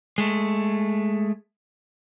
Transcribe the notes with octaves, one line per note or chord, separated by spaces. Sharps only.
G#3 A3